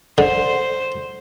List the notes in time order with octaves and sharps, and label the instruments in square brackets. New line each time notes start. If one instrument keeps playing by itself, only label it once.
[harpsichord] D3 [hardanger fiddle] C5